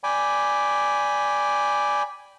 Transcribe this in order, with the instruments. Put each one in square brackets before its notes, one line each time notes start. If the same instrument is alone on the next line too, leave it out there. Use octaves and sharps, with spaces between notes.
[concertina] D5 G5 G#5 B5